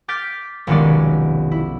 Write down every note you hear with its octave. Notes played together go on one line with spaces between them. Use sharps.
D6 F6 G6 A6 B6 D7
F1 B1 D#3 G#3 C#4 D5
E4